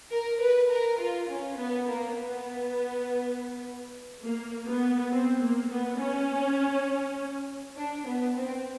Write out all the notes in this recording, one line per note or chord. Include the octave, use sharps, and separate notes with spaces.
A#4
B4
A#4
F4
C#4
B3
A#3
B3
A#3
B3
C4
A#3
B3
C#4
D4
B3
C4